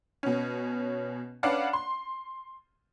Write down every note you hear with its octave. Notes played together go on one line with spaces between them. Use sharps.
B2 C#4
C#4 D4 B4 D5 F5 F#5
C6